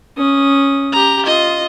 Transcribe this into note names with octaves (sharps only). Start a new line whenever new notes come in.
C#4 D#6
G4 A#5
F4 D#5